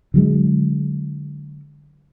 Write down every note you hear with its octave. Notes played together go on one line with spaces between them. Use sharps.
D3 F#3 G#3